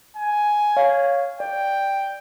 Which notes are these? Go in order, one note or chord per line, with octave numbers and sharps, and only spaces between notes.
G#5
C#5 F5
D5 G5